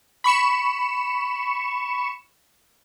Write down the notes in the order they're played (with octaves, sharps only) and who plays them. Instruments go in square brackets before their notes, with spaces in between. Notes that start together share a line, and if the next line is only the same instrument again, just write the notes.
[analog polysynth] B5 C#6 C#7 E7